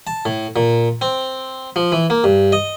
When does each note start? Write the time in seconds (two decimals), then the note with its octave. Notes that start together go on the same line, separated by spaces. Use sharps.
0.07 A5
0.26 A2
0.56 A#2
1.01 C4
1.76 F3
1.92 E3
2.10 A#3
2.24 G2
2.52 D#5